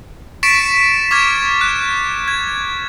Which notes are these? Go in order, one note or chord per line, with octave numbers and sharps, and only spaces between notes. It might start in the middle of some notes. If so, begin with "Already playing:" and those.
C#6 A6 B6 C#7 D7 E7
C#6 D6 F6 G#6 E7
F#6
G#6